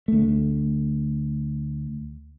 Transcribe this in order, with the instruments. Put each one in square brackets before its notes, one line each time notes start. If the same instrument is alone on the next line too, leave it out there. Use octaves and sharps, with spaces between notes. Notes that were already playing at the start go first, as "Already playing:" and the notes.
[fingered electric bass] D2 A3